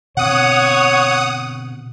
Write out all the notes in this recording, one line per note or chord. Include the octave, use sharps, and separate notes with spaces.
B2 D3 C4 C#5 F#5 D#6